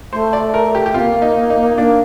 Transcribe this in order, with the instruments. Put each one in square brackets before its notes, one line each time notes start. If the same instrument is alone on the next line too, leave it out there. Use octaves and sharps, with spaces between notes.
[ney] A3 [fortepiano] C5
[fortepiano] D5
A#4
G4
G4
[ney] C4 [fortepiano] F4
[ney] A#3
[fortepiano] D#4
D#4
[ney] A#3 [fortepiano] D4